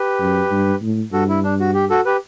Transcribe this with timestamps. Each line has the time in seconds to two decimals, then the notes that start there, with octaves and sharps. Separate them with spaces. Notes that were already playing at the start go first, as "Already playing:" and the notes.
Already playing: G4 B4
0.20 F#2
0.51 G2
0.82 A2
1.13 G2 F#4 A4
1.29 E4
1.44 D4
1.60 F#4
1.74 G4
1.90 F#4 A4
2.05 G4 B4